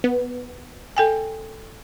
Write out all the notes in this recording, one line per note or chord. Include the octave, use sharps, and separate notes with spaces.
B3
A4 G5 G#5